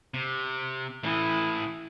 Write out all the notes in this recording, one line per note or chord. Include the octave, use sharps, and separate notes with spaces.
C3
A2 E3 E4 D#6